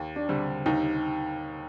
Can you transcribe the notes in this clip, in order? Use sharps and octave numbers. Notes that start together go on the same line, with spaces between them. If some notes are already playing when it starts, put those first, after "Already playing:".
Already playing: D#2
D4
D3 G3 C4
D#2 D#4